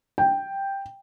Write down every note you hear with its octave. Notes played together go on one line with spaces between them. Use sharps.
G5